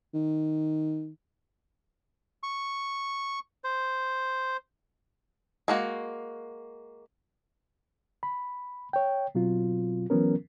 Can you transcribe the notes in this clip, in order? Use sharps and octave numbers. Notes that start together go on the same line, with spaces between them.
D#3
C#6
C5
G#3 A#3 F#4
B5
C#5 G5
B2 F#3 C4 F4
E3 F#3 B3 C#4 A#4